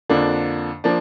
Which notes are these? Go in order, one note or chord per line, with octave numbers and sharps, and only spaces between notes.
F2 D3 F3 A#3 D4
F3 A#3 D4